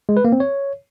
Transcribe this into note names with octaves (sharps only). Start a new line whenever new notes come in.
G#3
B4
A#3
C4
C#5